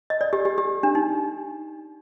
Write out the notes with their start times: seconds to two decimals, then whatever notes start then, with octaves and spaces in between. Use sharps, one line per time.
0.10 D#5
0.21 D5
0.33 G4
0.45 G4
0.58 G4
0.83 D4
0.95 D#4